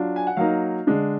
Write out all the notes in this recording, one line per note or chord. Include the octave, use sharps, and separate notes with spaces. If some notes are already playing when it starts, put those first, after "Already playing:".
Already playing: F#3 D4 F4
G#5
F#5
F#3 A#3 D#4 F5
D3 G#3 D4